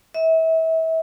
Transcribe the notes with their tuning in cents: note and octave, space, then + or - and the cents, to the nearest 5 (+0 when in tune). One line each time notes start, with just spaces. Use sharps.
E5 -30